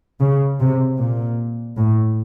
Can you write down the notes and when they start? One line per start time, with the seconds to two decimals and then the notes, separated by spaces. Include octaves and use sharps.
0.20 C#3
0.60 C3
0.99 A#2
1.77 A2